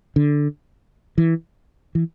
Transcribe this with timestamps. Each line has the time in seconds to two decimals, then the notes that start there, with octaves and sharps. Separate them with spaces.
0.16 D3
1.18 E3
1.95 E3